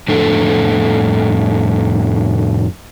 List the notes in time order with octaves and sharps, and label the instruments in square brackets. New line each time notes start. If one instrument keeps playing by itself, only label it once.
[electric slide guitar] F2 A2 D4 A4